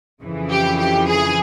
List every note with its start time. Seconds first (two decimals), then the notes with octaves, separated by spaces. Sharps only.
0.22 F2 C#3 E3
0.51 G4
0.78 G4
1.08 G#4